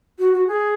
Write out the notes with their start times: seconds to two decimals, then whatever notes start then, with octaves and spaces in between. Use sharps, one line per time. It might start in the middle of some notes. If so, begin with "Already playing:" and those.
0.19 F#4
0.33 F#4
0.47 G#4